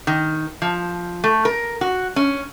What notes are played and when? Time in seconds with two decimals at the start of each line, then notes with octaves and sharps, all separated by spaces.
0.07 D#3
0.62 F3
1.24 A3
1.45 A#4
1.81 F#4
2.16 C#4